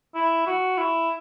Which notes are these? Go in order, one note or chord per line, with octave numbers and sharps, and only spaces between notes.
E4
F#4
E4